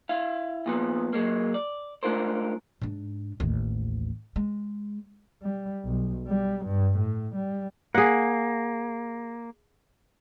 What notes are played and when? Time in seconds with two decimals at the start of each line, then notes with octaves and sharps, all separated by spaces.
0.09 E4 F5
0.66 A#2 F3 B3
1.13 F#3 G#3 A#3
1.54 D5
2.03 G#3 A3 D4 F4 A#4 C5
2.81 G#2 D4
3.40 A1 D#2
4.36 G#3
5.43 G3
5.85 B1
6.27 G3
6.66 G2
6.99 A2
7.36 G3
7.95 A#3 G#4 F#5